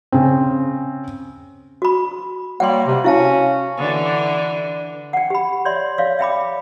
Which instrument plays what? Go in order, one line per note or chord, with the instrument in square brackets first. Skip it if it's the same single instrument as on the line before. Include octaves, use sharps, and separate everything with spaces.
[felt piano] C#3 C4
[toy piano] F#4 B5
[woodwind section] F#3 G3 A#3 [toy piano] F#5 G5 C6
[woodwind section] C3
[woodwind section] C#4 F#4 [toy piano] E4 F5 A5
[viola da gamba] D3 E3
[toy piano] F#5 G5
G4 B5
C#5 D5 E5 C6
C#5 D5 E5 F5
E5 G5 B5 D6